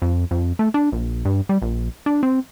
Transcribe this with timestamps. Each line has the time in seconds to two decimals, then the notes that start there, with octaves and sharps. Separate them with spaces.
0.02 F2
0.31 F2
0.59 A3
0.74 D4
0.92 A#1
1.25 G2
1.49 G3
1.62 A#1
2.06 D4
2.23 C4